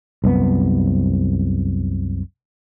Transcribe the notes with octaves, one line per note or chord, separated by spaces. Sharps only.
C2 F#2 B3